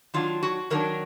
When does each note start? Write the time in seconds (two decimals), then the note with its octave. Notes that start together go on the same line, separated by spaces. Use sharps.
0.14 D#3 F#3 D4 F4
0.43 F#4
0.70 D#3 F#3 D4 A#4